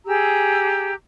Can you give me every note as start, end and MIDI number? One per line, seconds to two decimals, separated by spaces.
0.06 0.94 67
0.06 0.94 68
0.06 0.94 82
0.06 0.94 88